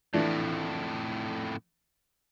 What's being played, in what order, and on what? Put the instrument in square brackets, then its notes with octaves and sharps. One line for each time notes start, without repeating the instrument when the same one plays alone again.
[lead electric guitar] F2 A2 [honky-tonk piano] E3 A3 D4